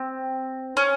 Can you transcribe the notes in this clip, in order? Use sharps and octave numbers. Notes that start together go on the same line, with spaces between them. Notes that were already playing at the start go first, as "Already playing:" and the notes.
Already playing: C4
C#4